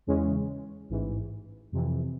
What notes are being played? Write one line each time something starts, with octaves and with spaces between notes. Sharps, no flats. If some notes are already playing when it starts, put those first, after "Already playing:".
E2 C#3 E3 G#3 C#4
A1 G#2 E3
F2 C3 E3